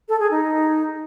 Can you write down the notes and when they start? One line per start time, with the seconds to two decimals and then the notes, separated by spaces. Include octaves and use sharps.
0.09 A4
0.20 G#4
0.31 D#4